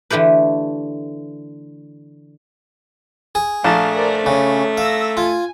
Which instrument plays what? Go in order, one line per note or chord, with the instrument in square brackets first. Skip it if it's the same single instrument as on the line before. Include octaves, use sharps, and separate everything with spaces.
[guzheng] D3 E3 A3 G4 B4
[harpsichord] G#4
[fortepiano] A#1 A5 [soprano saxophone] A3 [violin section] F5
[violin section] A#4 C5 D5
[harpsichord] C#3 [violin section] C#4
[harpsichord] F5 [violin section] E6 A#6
[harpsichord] F4 [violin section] G#5